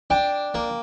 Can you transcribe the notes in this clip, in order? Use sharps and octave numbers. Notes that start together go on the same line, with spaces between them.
D4 G5
A#3